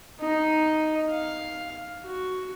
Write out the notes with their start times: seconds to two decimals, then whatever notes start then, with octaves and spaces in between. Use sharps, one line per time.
0.21 D#4
1.11 F5
2.05 F#4